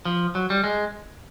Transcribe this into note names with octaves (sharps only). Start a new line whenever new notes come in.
F3
F#3
G3
G#3